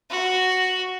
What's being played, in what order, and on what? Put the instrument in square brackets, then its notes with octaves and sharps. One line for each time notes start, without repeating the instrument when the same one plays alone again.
[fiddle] F#4